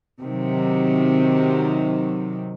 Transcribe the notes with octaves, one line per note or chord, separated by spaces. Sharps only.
C3 D#3 F#3